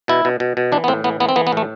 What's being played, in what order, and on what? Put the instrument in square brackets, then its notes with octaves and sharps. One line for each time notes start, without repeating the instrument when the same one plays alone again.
[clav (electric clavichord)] B2 E4
B2
B2
B2
E3 D4
B3
A2 C4
E3 B3
E3 B3
C4
E3 B3
B3
A2 A3